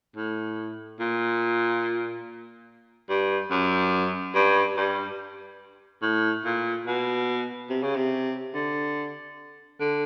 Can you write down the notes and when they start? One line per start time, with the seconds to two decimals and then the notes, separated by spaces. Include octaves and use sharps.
0.16 A2
1.00 A#2
3.10 G2
3.51 F#2
4.34 G2
4.77 G2
6.02 A2
6.45 A#2
6.87 B2
7.70 C3
7.83 C#3
7.96 C3
8.54 D3
9.80 D3